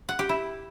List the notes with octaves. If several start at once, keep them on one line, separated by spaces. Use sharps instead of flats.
F#5
G4
E4